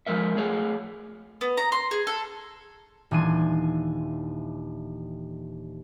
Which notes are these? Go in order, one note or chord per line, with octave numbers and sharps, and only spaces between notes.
F3 G#3 A#4 E5
A3 G#4 C#5 F5
B3
A#5
C6
G#4
A4
D#1 E3 D4 G#5 C6 D#7